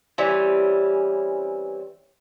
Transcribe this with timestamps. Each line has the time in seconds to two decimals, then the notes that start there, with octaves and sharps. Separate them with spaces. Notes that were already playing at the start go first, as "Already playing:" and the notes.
0.18 E3 G3 C4 C#4